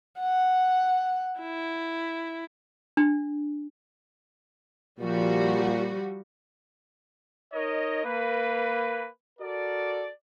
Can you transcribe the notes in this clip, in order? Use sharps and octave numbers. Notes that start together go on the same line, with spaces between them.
F#5
E4
D4
A#2 F3 G3 F#4
D#4 A#4 C#5 D#5
A#3 B4
F#4 A4 A#4 D5